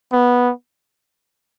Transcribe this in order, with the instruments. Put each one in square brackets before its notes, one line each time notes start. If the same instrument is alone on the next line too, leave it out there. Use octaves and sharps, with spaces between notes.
[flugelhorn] B3